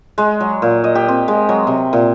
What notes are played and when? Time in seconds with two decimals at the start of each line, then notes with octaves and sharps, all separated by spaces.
0.18 G#3
0.40 F#3
0.62 A#2
0.84 D#5
0.95 G4
1.08 C4
1.28 G#3
1.49 F#3
1.67 C3
1.93 A#2